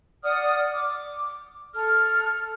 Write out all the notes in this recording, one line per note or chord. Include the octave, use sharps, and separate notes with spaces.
D5 F#5 D#6 F6
D6
A4 F6